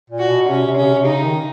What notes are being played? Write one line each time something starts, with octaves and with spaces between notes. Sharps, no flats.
A#2
F#4
B2
C3 C#4
C3
C#3 C#4
C3
C3
C#3 D#4
D#3